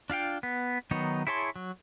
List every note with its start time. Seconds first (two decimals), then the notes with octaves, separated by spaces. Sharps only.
0.10 D4 F4 F5 G5
0.43 B3
0.91 D#3 F#3 B3 D#4 C#5
1.27 E4 G#4 C#5 A5 C6
1.56 F#3